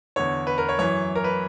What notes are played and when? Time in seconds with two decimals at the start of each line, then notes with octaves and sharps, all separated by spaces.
0.16 E2 D3 C#5
0.47 B4
0.58 A#4
0.69 C#5
0.79 F#2 E3 C#5
1.15 A#4
1.24 B4